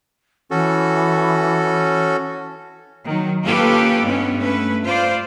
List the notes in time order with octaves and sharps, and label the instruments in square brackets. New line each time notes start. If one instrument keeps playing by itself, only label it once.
[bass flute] E3 [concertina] C#4 F#4 A4
[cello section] D#3 F#3
A#3 C#4 F4 G4 A4 B4
G2 G#3 B3 C#4
A3 C#4 B4
F4 C5 D5